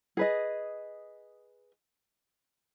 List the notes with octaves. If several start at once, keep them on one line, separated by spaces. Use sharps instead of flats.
G#4 B4 D#5